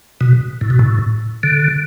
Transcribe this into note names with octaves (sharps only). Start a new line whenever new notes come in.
B2
A2
B2
A2
D3